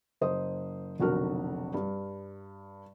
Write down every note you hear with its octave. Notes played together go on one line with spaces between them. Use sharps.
F#1 C5 D#5 D#6
F1 B1 D3 F#4 A#4 F6
G2